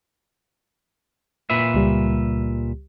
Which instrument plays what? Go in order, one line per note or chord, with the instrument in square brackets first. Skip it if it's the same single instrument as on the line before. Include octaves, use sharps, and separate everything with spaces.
[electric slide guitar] A#2 B4 E5
[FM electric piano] C#2 G3